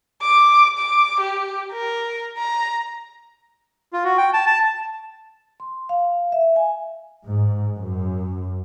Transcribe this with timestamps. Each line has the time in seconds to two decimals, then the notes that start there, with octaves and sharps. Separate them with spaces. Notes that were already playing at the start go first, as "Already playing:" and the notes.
0.22 D6
0.78 D6
1.21 G4
1.73 A#4
2.38 A#5
3.93 F4
4.04 F#4
4.18 G5
4.33 A5
4.47 A5
5.60 C6
5.89 F5
6.32 E5
6.56 G#5
7.26 G#2
7.76 F#2